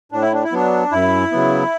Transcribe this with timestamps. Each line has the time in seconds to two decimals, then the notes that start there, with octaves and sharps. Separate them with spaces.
0.12 A2 D4
0.22 E4
0.33 D4
0.44 E4
0.52 F#3 B3 D4
0.91 F#2 E4
1.32 C#3 F#3 B3